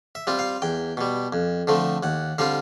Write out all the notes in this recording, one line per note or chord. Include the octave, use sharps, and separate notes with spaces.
E5
G3 C4 F4
F5
E2 G5
B2 G3
F2
D3 F3 A3 C4
D#2 F#5
D3 G3 C4 F4 F5